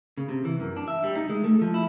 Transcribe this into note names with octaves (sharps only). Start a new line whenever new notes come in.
C#3
C3
E3
F#2
D4
E5
G3
D#4
G#3
A3
F3
E4